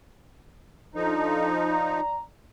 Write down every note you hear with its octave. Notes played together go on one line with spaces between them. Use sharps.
F3 D4 D#4 A4
D5 A#5